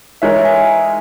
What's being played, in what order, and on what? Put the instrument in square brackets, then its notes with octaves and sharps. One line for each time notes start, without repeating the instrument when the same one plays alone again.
[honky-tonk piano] E3 G#3 D#4 A#4 [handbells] C#5 E5
[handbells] E5 G#5